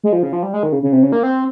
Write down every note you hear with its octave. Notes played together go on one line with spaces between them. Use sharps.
G#3
F3
C#3
F3
G3
G#3
D#3
C#3
C#3
C3
C#3
A#3
C4